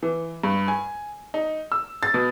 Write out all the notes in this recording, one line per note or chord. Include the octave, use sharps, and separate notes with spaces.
E3
G2
G#5
D#4
E6
A6
B2